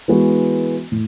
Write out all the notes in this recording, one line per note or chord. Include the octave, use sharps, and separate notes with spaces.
E3 G#3 B3 F#4
A2